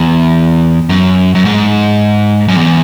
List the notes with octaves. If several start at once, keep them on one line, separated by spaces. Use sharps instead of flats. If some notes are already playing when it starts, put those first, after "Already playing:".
Already playing: E2
F#2
F#2
G#2
F#2
E2